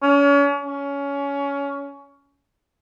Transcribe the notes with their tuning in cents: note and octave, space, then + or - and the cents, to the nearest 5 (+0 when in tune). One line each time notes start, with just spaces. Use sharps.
C#4 +35
C#4 +20